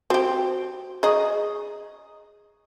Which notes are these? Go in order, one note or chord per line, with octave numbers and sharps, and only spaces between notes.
C4 F#4 G4 C5
G#4 D#5 A#5 C#6